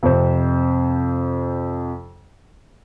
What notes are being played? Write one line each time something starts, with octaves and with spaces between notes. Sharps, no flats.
F2 C3 C5